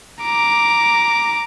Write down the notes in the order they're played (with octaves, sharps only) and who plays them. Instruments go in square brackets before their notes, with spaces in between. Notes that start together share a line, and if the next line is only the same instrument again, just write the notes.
[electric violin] A#5 D6